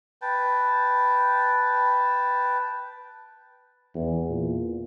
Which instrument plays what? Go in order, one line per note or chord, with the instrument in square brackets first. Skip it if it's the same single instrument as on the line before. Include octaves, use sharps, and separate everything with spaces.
[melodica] B4 G5 A5
[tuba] E2
A#2